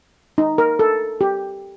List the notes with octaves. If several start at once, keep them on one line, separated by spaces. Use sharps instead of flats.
D#4
A#4
A4
G4